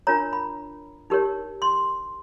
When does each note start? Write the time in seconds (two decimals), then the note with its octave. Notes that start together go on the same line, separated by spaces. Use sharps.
0.07 D4 F4 A#4 C#5 A#5
0.33 B5
1.10 D#4 G4 A#4 C#5
1.62 C6